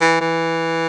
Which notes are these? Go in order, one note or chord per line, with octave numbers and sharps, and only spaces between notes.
E3
E3